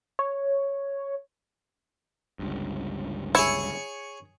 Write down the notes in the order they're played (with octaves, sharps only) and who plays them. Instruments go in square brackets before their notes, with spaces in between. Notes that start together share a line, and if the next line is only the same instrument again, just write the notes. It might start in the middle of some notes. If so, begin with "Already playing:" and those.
[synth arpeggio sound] C#5
[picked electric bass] G1 C#2 G2
[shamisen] E4 [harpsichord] G#4 C#5 C#6